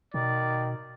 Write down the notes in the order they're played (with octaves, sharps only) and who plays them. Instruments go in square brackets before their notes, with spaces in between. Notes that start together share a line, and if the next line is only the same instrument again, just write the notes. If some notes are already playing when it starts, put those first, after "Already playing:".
[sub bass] B2 [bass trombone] D#3 [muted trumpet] D5